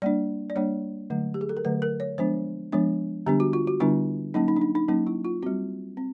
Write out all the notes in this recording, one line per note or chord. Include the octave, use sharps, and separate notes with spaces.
G3 A#3 D4 D5
D5
G3 A#3 D4 C#5
D3 F#3 A3
G4
G#4
A4
A#4
D3 F#3 A3 B4
A#4
C#5
F3 G#3 B3 D4 C5
F3 G#3 B3 D4
D3 G3 B3 D4 G4
F#4
F4
F#4
D3 G3 B3 D4 E4
F#3 A#3 C#4 D#4
D#4
D4
D#4
D#4
F#3 A#3 C#4 D#4
E4
F4
G3 C4 F#4
C4